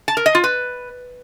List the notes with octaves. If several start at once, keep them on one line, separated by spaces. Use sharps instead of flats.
A5
A#4
D#5
F4
B4